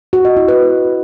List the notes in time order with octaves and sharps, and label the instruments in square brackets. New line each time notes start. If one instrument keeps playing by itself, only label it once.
[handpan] F#4
D#5
E4
B4